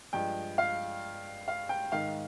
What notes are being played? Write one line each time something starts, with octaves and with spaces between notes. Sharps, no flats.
G2 F3 G#3 G5
F5
F5
G5
G#2 D#3 G#3 F5